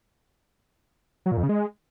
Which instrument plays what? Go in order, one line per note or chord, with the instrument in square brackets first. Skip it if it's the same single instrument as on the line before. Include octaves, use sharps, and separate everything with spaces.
[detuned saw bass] F#3
A#2
F2
C#3
G#3